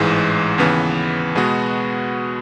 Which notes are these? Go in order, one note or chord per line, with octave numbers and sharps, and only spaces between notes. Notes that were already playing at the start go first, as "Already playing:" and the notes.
Already playing: A1 G#2 E3 G#3
D#2 C#3 E3 B3
B2 G#3 B3 F#4